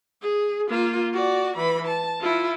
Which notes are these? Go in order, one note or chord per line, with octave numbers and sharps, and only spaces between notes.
G#4
A#3 F4
F#4 D5
E3 B5
A5
E4 F4